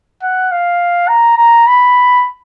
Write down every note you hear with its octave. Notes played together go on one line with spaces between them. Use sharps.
F#5
F5
A#5
A#5
B5